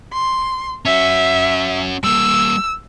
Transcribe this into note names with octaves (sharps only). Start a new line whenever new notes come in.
C6
C#4 F#4 E5
G3 A#3 E6